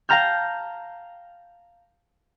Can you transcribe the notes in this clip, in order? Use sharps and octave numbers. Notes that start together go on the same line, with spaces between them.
F5 G5 A5 A#5 F6 G6